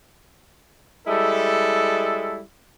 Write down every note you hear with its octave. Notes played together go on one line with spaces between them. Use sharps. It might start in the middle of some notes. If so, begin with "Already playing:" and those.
G3 G#3 E4 A4